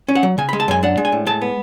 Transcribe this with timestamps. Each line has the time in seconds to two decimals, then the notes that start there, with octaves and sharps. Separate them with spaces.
0.08 C#4
0.15 F#5
0.23 F#3
0.38 C#3 G#5
0.49 B5
0.53 G#3
0.60 A5
0.68 F#2 G#5
0.83 D4 F#5
0.97 G#3
1.05 G#5
1.12 A2
1.26 G#3 A5
1.42 B3